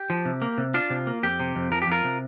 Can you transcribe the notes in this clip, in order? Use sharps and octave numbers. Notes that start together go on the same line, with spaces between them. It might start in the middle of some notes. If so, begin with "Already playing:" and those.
Already playing: G4
F3
C3
A#3
C3
D4 F4
C3
A#3
F2 G4
C3
F2
F3 A#4
G4
F2 F4 A#4
C3